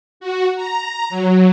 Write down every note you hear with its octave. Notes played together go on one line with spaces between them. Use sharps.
F#4
A#5
F#3